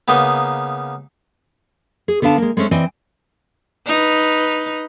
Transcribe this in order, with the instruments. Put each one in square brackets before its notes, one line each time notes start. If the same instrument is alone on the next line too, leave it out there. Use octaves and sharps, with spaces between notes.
[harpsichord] C#3 A#3 B3 D#4
[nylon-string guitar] G#4
D3 B3 D4 F5 A5
G#3 A#3
G#3 A3 C4 C#4
E3 C4 D5 D#5 G#5
[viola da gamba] D#4 B4